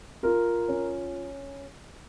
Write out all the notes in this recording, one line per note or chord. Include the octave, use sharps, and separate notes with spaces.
F4 A#4
C#4